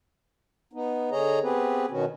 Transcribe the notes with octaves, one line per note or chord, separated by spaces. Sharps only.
B3 D#4
D3 G#4 C#5 D#5 A#5
B3 C4 G4 G#4 B4
B2 D#3 B3 C#4 F#4